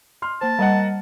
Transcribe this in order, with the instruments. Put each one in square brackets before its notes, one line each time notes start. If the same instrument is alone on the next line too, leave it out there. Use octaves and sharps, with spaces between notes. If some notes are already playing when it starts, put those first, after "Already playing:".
[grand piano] C6 F6
[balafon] A#3 C5 [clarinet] A5
[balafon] G3 [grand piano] A#4 D#5 F#5